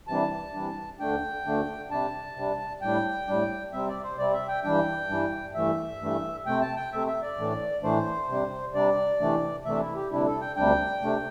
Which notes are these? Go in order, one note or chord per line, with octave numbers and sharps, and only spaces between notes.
C3 E3 G3 D4 A5
C3 E3 G3 D4
D2 D3 A3 D4 G5
D2 D3 A3 D4
C3 G3 D4 A5
C3 G3 D4
A2 G3 D4 G5
A2 G3 D4
C3 G3 C4 E5
D5
C5
C3 G3 C4 D5
E5
G5
G2 E3 G3 D4 G5
G2 E3 G3 D4
G2 E3 A3 E5
G2 E3 A3
C3 A3 C4 G5
A5
G5
C3 A3 C4 E5
E5
D5
A2 E3 A3 D4
A2 E3 A3 D4 C5
C3 G3 D4
C3 G3 D4 D5
C3 E3 A3 D4
C3 E3 A3 D4 E5
E4
G4
D2 C3 G3 D4 E4
A4
G5
D2 C3 G3 D4 G5
C3 A3 D4